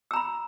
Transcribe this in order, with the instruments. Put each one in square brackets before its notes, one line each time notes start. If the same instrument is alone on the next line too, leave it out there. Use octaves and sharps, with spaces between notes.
[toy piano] E6
A#5
B5